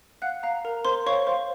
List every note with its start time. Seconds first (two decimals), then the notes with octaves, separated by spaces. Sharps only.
0.22 F5 F#5 F#6
0.43 F5 A#5
0.65 A#4 A#5
0.85 A#4 C5 C6
1.06 C#5 F5 C#6
1.27 C5 F5 C6